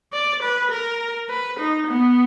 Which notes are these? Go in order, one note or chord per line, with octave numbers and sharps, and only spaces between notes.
D5
B4
A#4
B4
D#4
B3